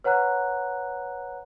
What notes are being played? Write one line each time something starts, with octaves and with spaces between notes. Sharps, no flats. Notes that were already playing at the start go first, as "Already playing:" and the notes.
B4 C#5 F#5 A#5 F#6